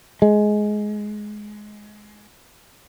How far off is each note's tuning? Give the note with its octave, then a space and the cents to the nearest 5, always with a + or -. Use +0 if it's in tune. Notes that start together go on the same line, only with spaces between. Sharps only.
G#3 +15